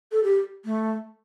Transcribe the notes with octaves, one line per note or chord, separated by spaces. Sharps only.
A4
G4
A3